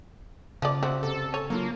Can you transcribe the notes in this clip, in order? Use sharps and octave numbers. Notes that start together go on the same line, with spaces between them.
C#3 F3 D5
C4 F#4 C5 E5 F#5
C3 A4
C#5 G#5
F#3 A#3 D4 F4